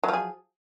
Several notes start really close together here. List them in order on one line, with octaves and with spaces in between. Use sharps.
F#3 F3 G#4